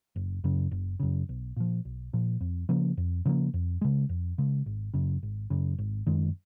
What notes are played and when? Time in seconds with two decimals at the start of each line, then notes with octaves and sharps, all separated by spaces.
0.16 F#1
0.44 F#2 C#3
0.71 F#1
1.00 F#2 C#3
1.29 B1
1.56 A#2 F3
1.85 B1
2.13 A#2 F3
2.41 F2
2.69 C#3 F3 A#3
2.97 F2
3.25 C#3 F3 A#3
3.54 F2
3.81 C#3 G#3
4.09 F2
4.38 C#3 G#3
4.66 G#1
4.94 F#2 C#3
5.23 G#1
5.50 F#2 C#3
5.78 G#1
6.07 F#2 D#3 G#3